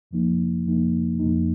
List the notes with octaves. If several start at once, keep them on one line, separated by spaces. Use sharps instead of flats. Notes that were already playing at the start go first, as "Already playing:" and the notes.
F2 F3 A#3 D#4
F2 F3 A#3 D#4
F2 F3 A#3 D#4